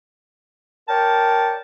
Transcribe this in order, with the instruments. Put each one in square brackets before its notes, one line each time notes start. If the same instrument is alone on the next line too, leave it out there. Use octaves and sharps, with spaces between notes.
[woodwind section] A#4 C#5 D5 G5 A5